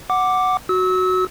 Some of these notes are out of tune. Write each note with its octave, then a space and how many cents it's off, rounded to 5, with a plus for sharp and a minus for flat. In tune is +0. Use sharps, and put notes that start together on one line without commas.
F#5 +0 D6 +0
F#4 +0 E6 -30